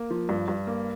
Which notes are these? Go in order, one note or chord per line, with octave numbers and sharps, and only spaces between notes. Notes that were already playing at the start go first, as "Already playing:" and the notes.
Already playing: A#3
F3
G2
G2
A#3